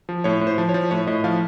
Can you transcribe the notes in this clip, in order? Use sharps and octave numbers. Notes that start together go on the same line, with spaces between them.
F3
A2 C#5
A2
C5
F3
C#5
F3
A2 C#5
A2 D#5
F3 F5